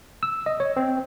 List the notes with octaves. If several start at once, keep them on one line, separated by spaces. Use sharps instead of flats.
E6
D#5
C#5
C4